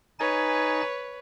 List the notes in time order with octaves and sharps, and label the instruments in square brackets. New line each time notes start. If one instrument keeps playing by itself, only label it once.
[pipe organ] D#4 G#5 A6 [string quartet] B4 C#5